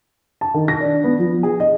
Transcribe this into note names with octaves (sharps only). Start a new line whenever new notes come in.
A5
D#3
A#6
D4
B3
F3
G#4
D#5